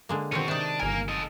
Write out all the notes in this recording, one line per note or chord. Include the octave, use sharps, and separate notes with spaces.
D3 G#3 A#3
B2 D#3 C4 C#4 F#4
C3 D4 D#4 C#6 D7
D#7
G1 A#3 A#4 G#5
A4 D#5